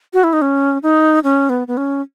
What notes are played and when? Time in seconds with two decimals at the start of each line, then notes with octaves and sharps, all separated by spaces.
0.14 F#4
0.24 E4
0.33 D#4
0.42 C#4
0.83 D#4
1.24 C#4
1.50 B3
1.68 B3
1.77 C#4